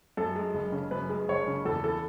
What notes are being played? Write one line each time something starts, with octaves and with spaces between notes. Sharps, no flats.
F#2 A4
G#3
F#1
C#3
F#2 B4
G#3
F#1 C#5
C#3
E2 A4
E3 A4